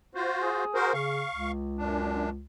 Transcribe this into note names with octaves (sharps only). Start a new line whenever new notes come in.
F4 F#4 C5
G#4
F#4 A#4 C5
C#3 F5 C#6
C#2
F#2 D4